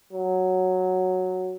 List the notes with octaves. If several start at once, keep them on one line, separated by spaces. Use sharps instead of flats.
F#3